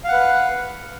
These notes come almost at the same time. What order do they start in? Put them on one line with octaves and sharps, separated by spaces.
F5 F#5 B4